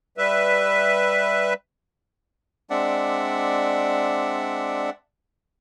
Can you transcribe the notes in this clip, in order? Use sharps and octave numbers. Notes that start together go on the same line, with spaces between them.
G3 B4 E5
G#3 C4 D4 D5 E5 F#5